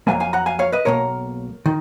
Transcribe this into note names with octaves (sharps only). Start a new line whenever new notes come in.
F2 C#3 F#3 A#3 F5 G#5
F5 G#5
F#5 A#5
F5 G#5
C#5 F5
B4 D#5
B1 B2 A#3 A#4 C#5
D#3